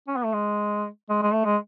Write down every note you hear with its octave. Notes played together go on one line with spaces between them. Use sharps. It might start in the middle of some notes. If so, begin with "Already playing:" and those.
C#4
B3
A3
G#3
G#3
G#3
A3
G#3